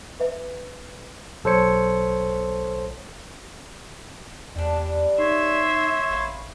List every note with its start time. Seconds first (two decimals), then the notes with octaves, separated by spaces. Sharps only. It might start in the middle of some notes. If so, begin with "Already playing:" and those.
0.20 B4 E5
1.44 B1 A4 C5 C#5 C#7
4.56 E2 G3 D4
5.18 D#4 C#5 E5 C6
6.10 A1 B4 F5